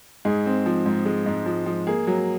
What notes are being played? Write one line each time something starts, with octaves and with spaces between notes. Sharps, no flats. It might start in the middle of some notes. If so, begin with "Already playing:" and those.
G#2 G#4
C4
F3
G#2
G#3
G#2
F3
F3
A#3 G#4
F#3